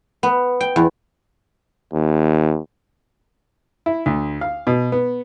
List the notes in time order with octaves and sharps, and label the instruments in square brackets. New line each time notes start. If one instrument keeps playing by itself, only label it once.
[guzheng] B3
G5
E2
[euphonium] D#2
[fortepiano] E4
D2
F5
B2
B3